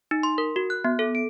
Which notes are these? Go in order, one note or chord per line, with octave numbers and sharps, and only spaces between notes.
D#4
C6
A#4
F#4
F#6
B3
A4
D7